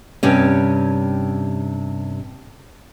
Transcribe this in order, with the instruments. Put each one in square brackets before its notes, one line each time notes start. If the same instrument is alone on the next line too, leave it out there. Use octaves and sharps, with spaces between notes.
[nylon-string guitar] G2 C3 C#4